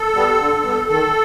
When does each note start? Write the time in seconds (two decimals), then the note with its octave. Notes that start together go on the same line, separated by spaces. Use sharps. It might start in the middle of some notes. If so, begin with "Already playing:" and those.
Already playing: A4
0.15 G3 B3
0.40 D3
0.64 G3 B3
0.89 D#3 A4